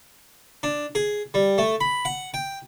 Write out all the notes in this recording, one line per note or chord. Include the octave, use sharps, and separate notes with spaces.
D4
G#4
G3
A3
B5
F#5
G5